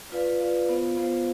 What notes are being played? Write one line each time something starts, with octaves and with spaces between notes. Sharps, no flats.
F4 B4 D5 F5
F4 B4 D5 F5
B3 F4 C5 F5
B3 F4 C5 F5